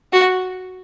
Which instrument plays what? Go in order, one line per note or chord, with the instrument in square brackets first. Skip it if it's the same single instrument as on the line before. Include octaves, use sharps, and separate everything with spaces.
[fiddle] F#4